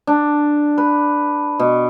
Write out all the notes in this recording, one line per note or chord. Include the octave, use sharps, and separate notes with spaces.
D4
B4
B2